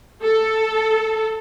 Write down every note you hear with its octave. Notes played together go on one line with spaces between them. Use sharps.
A4